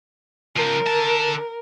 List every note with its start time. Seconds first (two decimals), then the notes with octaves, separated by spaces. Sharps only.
0.56 C#2 F3 A#4
0.87 D3 A5